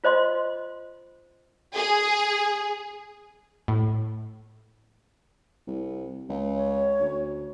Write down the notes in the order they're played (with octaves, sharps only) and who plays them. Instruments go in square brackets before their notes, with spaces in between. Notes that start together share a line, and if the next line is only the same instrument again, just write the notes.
[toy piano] F4 C5 D#5 C6
[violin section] G#4
[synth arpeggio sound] A2
[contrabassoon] C2
C#2
[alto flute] C#5
[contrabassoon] D2